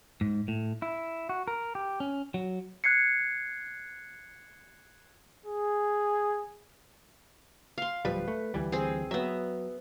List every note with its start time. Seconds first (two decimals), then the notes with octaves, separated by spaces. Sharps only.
0.21 G#2
0.48 A2
0.82 E4
1.29 F#4
1.48 A#4
1.75 G4
2.00 C#4
2.34 F#3
2.84 F#6 G#6 C7 C#7
5.46 G#4
7.78 F5 C6
8.05 D1 F3 G3 B4
8.28 A3
8.54 D2 E3 G3
8.72 C4 G#4
9.11 F#3 B3 E5